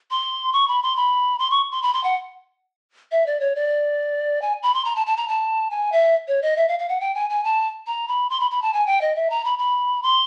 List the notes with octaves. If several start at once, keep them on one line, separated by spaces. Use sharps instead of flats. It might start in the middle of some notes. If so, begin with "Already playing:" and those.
C6
C#6
B5
C6
B5
C6
C#6
C6
B5
C6
F#5
E5
D5
C#5
D5
G#5
B5
C6
A#5
A5
A5
A#5
A5
G#5
E5
C#5
D#5
E5
F5
F5
F#5
G5
G#5
G#5
A5
A#5
B5
C6
B5
B5
A5
G#5
G5
D#5
E5
A#5
B5
B5
C6